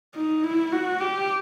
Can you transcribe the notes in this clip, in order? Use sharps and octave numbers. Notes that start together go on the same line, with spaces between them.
D#4
E4
F#4
G4